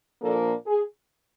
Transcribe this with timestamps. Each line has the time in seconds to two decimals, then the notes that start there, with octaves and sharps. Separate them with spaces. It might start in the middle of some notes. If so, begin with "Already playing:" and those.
0.21 A#2 F3 A#3 D4 A4
0.66 G#4